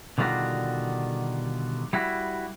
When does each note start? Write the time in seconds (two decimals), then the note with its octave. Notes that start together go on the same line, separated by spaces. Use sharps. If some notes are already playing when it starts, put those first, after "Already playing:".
0.18 B2 D3 D#3 G3 F4 F#4
1.93 G3 E4 F#4